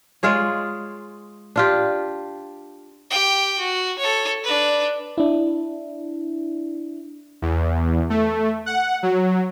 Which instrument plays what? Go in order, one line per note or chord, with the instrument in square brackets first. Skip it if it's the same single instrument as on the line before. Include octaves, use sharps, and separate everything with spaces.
[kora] G#3 F4 G#4 C#5
D4 F4 G4
[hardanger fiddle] G4 G5
F#4
A4 C#5
D4 B4
[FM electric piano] D4 E4
[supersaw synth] E2
A3
F#5
F#3